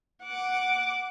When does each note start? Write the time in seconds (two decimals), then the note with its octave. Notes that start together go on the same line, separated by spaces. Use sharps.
0.24 F#5 D6